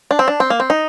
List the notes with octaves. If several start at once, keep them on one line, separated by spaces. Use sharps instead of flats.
D4
C4
D4
C4
A#3
C4
D#4